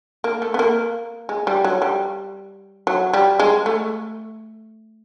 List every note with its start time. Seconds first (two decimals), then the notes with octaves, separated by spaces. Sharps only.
0.24 A#3
0.42 A3
0.54 B3
0.59 A#3
1.29 G#3
1.47 G3
1.64 F#3
1.82 G3
2.87 F#3
3.13 G3
3.40 G#3
3.66 A3